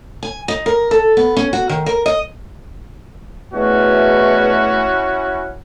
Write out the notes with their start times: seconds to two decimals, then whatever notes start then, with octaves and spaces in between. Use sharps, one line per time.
0.23 G#5
0.48 D#4
0.66 A#4
0.91 A4
1.17 B3
1.37 C#4
1.53 F#4
1.69 D#3
1.86 A#4
2.06 D#5
3.53 E2 B2 A3 C#4 E4 F#4